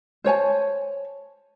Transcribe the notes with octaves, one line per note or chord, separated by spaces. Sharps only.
C5 C#5 G#5 A5